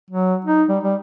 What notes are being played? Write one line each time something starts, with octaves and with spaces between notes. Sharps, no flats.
F#3
D#4
G3
G3